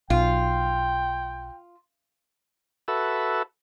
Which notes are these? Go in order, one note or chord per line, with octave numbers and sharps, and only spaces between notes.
B1 F4 G5
F#4 A4 B4 E5